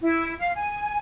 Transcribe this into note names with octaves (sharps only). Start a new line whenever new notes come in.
E4
F5
G#5